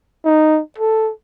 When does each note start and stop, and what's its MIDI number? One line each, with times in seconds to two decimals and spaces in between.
0.25 0.60 63
0.78 1.12 69